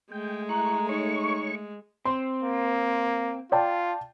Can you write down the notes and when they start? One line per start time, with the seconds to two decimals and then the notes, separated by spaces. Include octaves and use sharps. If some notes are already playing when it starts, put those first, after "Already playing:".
0.12 G#3 A3 G5
0.49 E4 A#5 C#6 F#6
0.89 D#4 C#5 C#6
2.05 C4 C6
2.43 A#3
3.52 F4 D5 G5 A5